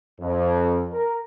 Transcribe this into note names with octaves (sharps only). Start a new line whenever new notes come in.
F2
A#4